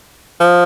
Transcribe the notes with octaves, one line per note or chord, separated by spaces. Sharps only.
F3